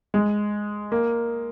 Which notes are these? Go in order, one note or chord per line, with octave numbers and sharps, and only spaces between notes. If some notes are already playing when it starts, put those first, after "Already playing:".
G#3
A#3